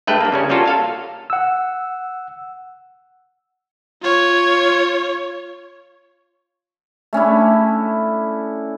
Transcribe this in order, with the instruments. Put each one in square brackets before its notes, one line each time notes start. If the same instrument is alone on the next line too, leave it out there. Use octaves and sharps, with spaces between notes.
[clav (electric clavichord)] G2 G#3 A3 B4 G5
G2 A#3
C#3 G3 C#4
G3 A#3 C#4 F4 F#4 A4
A4 F5 A5
[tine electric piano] F#5 E6
[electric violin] F4 C#5
[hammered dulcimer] A3 C#4 D4 E4